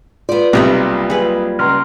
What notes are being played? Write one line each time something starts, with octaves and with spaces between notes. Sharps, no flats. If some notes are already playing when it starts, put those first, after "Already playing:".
B3 F4 D5
B1 C3 F#3 G3 A#3 B4
G#4 B4
C#2 A#5 C6 F6